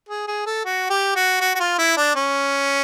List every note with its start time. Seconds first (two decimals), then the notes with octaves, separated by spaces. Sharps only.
0.09 G#4
0.28 G#4
0.46 A4
0.65 F#4
0.90 G4
1.16 F#4
1.41 F#4
1.55 F#4
1.60 F4
1.78 E4
1.97 D4
2.16 C#4